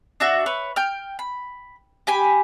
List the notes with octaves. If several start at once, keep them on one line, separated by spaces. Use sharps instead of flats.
D4 F#4 E5
B4 C#5
G5 F6
B5
G4 G#5 B5